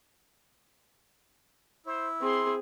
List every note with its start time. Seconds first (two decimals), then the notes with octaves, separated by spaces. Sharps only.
1.86 E4 C5
2.21 C4 G#4 C6